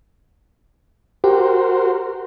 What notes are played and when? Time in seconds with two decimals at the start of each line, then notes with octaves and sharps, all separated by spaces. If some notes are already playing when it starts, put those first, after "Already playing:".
1.24 F#4 G4 A#4 C5